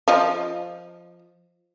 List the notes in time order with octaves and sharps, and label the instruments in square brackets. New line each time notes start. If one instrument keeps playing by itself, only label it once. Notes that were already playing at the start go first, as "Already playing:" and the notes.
[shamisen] F3 F4 D#5